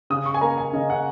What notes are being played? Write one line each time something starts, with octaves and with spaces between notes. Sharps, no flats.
C#3 D#6
C#6
G#5
A#3 A#5
G#5
C#3 D#5
F#5